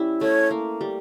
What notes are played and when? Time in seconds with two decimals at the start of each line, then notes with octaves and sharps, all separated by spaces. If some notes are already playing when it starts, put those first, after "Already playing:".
Already playing: G3 C#4 E4
0.21 A3 C#5
0.51 A#3
0.81 G3